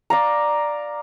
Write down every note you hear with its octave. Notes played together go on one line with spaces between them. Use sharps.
D5 F5 A#5